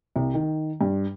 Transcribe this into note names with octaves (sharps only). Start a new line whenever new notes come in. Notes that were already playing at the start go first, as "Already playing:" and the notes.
C2
D#3
G2